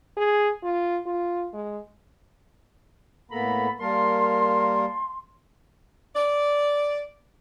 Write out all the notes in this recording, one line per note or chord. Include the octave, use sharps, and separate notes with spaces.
G#4
F4
F4
G#3
A2 A#3 B3 A4 A#5 B5
G3 A#3 A#4 F5 A5 C6
D5